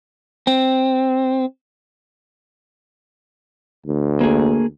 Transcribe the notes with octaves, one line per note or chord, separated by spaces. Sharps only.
C4
D2
A#3 G#4